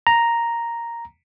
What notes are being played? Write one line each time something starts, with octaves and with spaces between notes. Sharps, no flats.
A#5